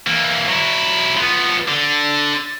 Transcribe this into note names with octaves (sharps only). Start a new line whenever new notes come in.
E3 A#3
F#3 E4
F3 B3
D3